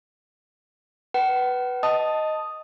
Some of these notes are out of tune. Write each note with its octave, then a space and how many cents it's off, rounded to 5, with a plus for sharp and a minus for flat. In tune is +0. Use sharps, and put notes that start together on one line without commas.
B4 +0 F#5 +40
D#5 +0 A5 +0 D#6 +0